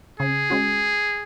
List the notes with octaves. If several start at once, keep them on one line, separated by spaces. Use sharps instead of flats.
C#3 G#4
G#3 C#4 F#4